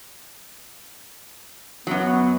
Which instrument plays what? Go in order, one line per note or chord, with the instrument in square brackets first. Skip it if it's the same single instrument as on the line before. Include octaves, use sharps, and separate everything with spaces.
[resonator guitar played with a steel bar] F#2 F#3 [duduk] B3